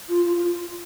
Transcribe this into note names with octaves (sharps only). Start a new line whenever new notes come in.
F4
F4
F4